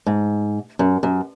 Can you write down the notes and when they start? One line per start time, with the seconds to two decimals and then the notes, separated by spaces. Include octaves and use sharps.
0.06 G#2
0.79 F#2
1.03 F#2